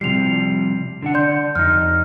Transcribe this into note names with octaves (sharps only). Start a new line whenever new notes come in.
C3 F3 G3 C7 F7
D3 D4 F#5
D5 C6 G6
F2 D#4 F6